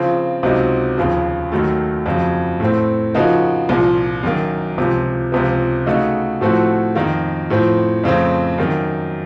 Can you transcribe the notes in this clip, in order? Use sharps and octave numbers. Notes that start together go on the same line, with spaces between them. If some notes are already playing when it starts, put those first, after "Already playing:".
Already playing: C#3 F3 C4 F4
C#2 C3 F#3 C4 D#4
D#2 C#3 F3
D#2 D#3 F#3 A3
F2 C#3 F#3
A2 A3 C4
C#3 F3 A#3 D#4 F#4
C2 A#2 F3
F#2 D#3 A#3
C#2 C3 F3
C#2 C3 F3
C#3 A3 D#4 F#4
A2 F3 A3 C4 F#4
F2 D#3 A#3
A2 F3 C4
F2 C#3 A3 C4
F#2 D#3 A#3